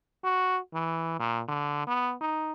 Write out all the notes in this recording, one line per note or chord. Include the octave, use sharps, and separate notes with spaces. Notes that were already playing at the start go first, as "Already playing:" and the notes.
F#4
E3
A#2
D3
B3
D#4